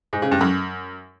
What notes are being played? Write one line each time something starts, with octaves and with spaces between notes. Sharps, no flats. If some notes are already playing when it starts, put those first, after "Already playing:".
G#2
C#3
G2
F#2